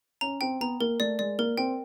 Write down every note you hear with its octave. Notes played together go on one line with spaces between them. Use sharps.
C#4 A#5
C4 G5
B3 A#5
A#3 A#4
A3 D5
G#3 D5
A#3 A#4
C4 G5